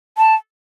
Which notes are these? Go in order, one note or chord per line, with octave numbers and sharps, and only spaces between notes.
A5